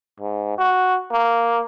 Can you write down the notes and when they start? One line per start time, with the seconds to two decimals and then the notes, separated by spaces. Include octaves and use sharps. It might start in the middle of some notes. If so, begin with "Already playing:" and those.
0.20 G#2
0.58 F#4
1.12 A#3